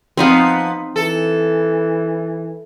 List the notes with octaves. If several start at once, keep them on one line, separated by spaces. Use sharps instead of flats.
F3 B3 C4 D#4 F5
E3 A4